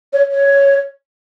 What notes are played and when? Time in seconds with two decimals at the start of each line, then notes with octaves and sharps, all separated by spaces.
0.13 C#5
0.31 C#5